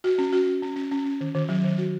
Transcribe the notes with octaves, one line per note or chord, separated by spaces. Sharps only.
F#4
C#4
F#4
F#4
C#4
C#4
C#4
C#4
D#3
D#3
F#3
D#3
F#4